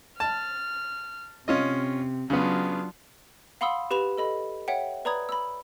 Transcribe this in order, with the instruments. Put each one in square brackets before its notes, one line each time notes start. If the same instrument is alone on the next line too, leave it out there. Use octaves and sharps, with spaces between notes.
[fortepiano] A5 [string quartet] F6
[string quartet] C3 [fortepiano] C#4 F4 D#5
[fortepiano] C#3 B3 [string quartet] F#3 D4 F4
[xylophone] F5 F#5 B5 C6 D#6 E6
G4 B4 B5 E7 F7
A4 D#5 B5
C#5 E5 F#5 G5
B4 D5 A#5 B5 D#6 G#6
B5 E6